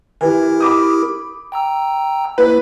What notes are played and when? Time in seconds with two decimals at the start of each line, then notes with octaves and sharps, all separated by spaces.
0.21 E3 E4 G4 A#4
0.60 B5 D6 D#6
1.52 G5 A#5 E6
2.38 A#3 E4 B4